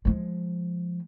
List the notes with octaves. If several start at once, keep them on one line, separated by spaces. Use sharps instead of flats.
F3 G#3